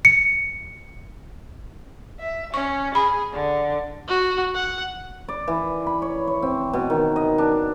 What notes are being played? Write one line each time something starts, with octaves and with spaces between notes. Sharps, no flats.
C#7
E5
C#4 C#6
G#4 B5
D3
F#4
F#5
D5
E3
B5
C#5
C#5
C4
B2
D#3
D#5
D4